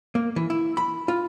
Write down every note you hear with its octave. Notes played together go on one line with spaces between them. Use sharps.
A#3
E3
E4
B5
F4